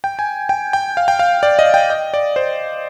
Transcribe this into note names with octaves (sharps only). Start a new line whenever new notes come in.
G5
G#5
G5
G5
F5
G5
F5
D5
D#5
G5
D#5
D5
C5